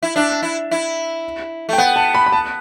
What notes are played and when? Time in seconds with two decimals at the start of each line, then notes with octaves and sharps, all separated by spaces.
0.03 E4
0.16 D4 E5
0.42 E4
0.71 E4
1.69 A3
1.73 G5
1.78 B3 F#5
1.96 A5
2.14 B5
2.26 B5
2.32 A5